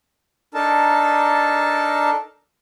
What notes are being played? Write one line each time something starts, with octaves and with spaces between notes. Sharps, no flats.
D4 D#4 A4 A#4 A5